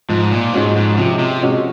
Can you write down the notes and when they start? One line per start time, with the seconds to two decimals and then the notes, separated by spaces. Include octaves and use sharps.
0.09 G#2 F3
0.31 A#2
0.53 G#2 G#3 C#4 F#4
0.76 G#2
0.97 C3 F3
1.19 C3
1.41 G#3 C#4 F#4